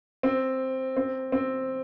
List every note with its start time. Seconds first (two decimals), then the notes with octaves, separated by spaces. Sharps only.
0.23 C4
0.97 C4
1.32 C4